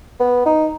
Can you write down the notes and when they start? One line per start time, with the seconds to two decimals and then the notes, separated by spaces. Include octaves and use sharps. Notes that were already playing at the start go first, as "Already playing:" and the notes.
0.20 B3
0.46 D#4